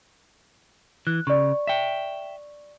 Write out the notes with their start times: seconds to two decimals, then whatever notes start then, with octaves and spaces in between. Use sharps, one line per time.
1.07 E3 F#6
1.27 C#3 D5 C#6
1.67 E5 G5